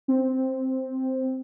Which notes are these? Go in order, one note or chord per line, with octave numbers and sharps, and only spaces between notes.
C4